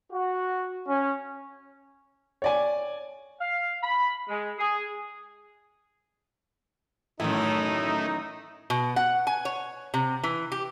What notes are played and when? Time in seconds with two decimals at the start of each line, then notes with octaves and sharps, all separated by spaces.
0.11 F#4
0.88 C#4
2.42 C#5 D5 G#5
3.40 F5
3.83 B5
4.29 G#3
4.59 G#4
7.20 F#2 A2 D#3 E3 A3 D#4 E4 D#5
8.70 B2
8.96 F#5
9.27 G#5
9.45 C#5
9.94 C3
10.24 E3
10.52 G4